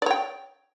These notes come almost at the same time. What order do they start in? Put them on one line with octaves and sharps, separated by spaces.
D5 C#5 G5